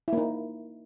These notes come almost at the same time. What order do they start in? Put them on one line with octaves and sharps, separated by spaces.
E4 A#3 D#4